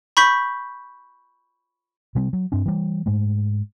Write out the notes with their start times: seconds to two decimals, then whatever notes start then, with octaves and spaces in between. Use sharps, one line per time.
0.17 B5 C#6 G6 B6
2.15 C3 G3 C4
2.33 F#3
2.52 G2 C4 D4
2.66 E3 G3
3.06 G#2 G#3 A3